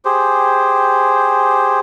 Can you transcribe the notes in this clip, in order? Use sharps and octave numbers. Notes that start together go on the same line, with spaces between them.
G4 G#4 C5